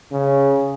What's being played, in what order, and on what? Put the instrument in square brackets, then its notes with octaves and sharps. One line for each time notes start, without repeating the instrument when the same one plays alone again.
[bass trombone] C#3